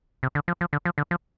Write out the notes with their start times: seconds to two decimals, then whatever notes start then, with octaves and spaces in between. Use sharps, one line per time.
0.23 C3
0.35 D3
0.48 F3
0.61 F3
0.73 D3
0.85 F3
0.98 D3
1.11 F3